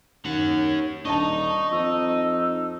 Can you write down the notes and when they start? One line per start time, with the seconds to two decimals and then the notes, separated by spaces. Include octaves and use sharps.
0.25 D#2 C#4 F#5
1.05 D#1 D4 D#4 A5 C#6
1.72 F2 E6